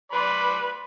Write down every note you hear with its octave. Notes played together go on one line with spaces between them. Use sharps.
B4 D5 B5 C6